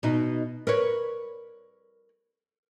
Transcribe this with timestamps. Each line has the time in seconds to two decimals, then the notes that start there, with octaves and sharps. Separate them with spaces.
0.03 B2 D#4
0.67 A#4 B4 C#5